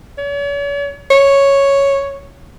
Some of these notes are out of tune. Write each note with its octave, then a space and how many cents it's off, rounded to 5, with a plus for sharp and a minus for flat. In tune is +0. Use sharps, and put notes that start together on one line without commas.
C#5 +45
C#5 +0